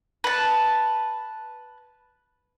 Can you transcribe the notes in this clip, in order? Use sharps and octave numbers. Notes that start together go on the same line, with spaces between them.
B4 A5